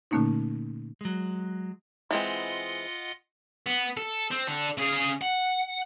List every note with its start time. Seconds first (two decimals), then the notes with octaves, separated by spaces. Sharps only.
0.11 A#2 D3 A3 A#3 C#4 D#4
1.01 F#3 G#3
2.11 E3 G#3 C4 F4 D#5 F#5
3.67 B3
3.97 A4
4.31 C4
4.48 D4 A4
4.78 C#3 G#4
5.21 F#5